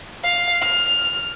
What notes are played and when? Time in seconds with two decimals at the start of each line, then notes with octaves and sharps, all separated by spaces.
0.24 F5
0.62 F6